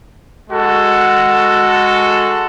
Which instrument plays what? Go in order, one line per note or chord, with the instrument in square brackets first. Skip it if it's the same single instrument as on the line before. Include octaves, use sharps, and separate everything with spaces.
[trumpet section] G#3 F#4 A4